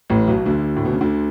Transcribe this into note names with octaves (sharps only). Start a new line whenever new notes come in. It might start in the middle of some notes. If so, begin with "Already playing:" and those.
A1 A2
B1 B2
D2 D3
A2
B2
C#3
D2 D3